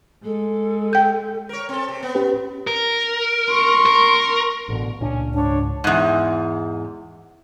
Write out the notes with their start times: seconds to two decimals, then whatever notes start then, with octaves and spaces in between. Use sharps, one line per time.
0.24 G#3 A4
0.93 G5 G6
1.49 A#4 C#5
1.69 C4 A4
1.88 C3
2.03 B3
2.15 C#4 G4 B4
2.67 A#4
3.50 C6 C#6
3.86 A#4
4.69 A1 B2 D3
5.01 C#2 A#2 C#4 D4
5.34 C#2 G#2 D4 C#5
5.84 E2 G#2